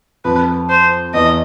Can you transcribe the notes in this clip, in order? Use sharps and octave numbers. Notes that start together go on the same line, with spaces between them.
F2 B4
C5
E2 D#5